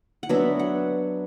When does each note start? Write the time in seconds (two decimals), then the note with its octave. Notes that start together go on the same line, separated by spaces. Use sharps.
0.23 F#5
0.29 F#3 B3 D4 E5
0.59 F#5